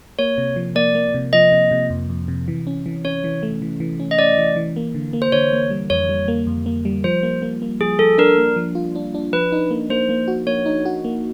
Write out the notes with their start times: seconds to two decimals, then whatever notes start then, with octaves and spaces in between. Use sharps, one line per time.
0.19 A#3 C#5
0.38 C3
0.56 F3
0.75 A#3 D5
0.95 A#3
1.14 C3
1.33 F3 D#5
1.52 C3
1.71 C3
1.90 F2
2.09 F2
2.28 C3
2.48 E3
2.67 C#4
2.86 E3
3.05 C#4 C#5
3.24 E3
3.43 A3
3.62 E3
3.80 E3
4.00 C#4
4.11 D#5
4.19 C#4 D5
4.38 E3
4.56 E3
4.76 A#3
4.95 D3
5.13 A#3
5.22 C5
5.32 D3 C#5
5.53 A#3
5.70 G3
5.90 F2 C#5
6.09 G3
6.28 A#3
6.47 F2
6.66 A#3
6.85 G3
7.04 F3 C5
7.23 A#3
7.42 A#3
7.62 A#3
7.81 F3 G#4
7.99 F3 A4
8.18 D4 A#4
8.38 A#3
8.56 F3
8.75 F4
8.95 D4
9.14 D4
9.33 F3 B4
9.52 D#4
9.71 A#3
9.90 A#3 C5
10.09 A#3
10.28 F#4
10.47 A#3 C#5
10.66 D#4
10.85 F#4
11.05 A#3